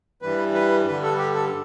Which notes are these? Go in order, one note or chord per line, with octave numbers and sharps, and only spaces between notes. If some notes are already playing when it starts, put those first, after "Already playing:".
G2 E3 G3 B4
B4
G2 D3 G3 B4
A4
G4
A4